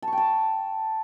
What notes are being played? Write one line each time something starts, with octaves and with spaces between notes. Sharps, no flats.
A5
C#6
G5
A5